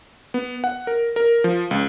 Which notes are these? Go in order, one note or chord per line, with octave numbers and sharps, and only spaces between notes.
B3
F#5
A#4
A#4
F3
C#2